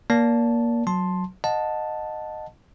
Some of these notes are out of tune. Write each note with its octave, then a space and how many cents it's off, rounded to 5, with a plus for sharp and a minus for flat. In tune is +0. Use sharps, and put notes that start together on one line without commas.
A#3 +15 D5 -30 A5 -5
F#3 +0 A5 +0 C6 +5
D#5 -10 F#5 -40 A5 +0